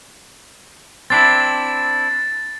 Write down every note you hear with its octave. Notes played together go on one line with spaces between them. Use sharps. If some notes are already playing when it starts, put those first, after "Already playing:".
C4 D4 E4 A6 C7